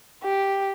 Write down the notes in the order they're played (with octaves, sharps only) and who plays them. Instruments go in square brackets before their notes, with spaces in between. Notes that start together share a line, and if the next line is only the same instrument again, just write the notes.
[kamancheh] G4